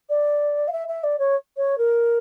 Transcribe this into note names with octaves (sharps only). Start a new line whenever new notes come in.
D5
F5
E5
E5
D5
C#5
C#5
A#4